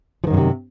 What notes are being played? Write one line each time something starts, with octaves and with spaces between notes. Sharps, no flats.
F#2 A2 C3 D#3 F3